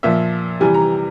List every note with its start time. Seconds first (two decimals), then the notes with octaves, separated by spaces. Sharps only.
0.03 A#2 F3 E5
0.60 C3 E3 G3 G#5
0.74 A#5